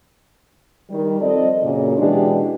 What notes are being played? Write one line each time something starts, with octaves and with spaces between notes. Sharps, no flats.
D#3 G3
F3 C4 A4 D5 D#5
F#2 A#2 C#3
B2 E3 G#3 D4 G4